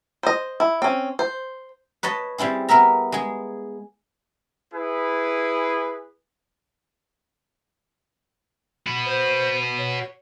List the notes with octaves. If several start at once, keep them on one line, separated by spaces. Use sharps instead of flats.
C5 D#5
E4
C4 C#4
C5
B4 C#5 D#5 A5
G3 C4 E4 G#4
B3 A#4 E5 A#5
G#3 G#4
E4 G#4 B4
F#4 B4
C5
C#5